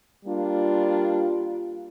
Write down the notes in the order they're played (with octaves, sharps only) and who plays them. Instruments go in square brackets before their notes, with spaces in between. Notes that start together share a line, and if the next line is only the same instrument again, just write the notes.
[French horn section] G3 A#3 D4 F4